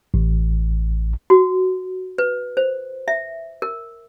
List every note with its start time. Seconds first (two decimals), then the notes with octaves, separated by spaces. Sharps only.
0.14 A1
1.30 F#4
2.18 B4
2.57 C5
3.08 E5
3.62 A#4